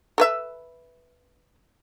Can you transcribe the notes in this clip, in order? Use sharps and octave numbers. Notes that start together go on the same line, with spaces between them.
A4 B4 E5